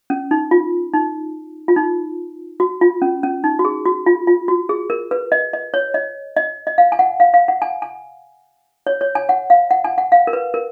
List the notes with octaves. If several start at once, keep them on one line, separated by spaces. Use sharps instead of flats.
C#4
D#4
F4
D#4
F4
D#4
F#4
F4
C#4
C#4
D#4
F#4
G#4
F#4
F4
F4
F#4
G#4
A#4
B4
D#5
D#5
C#5
D#5
D#5
D#5
F5
G#5
F#5
F5
F5
F#5
G#5
G#5
C#5
C#5
G#5
F#5
F5
F#5
G#5
F#5
F5
A#4
B4
A#4